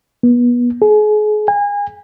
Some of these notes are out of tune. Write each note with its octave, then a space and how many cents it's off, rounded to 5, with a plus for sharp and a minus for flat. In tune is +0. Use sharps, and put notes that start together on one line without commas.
B3 -25
G#4 +35
G#5 -30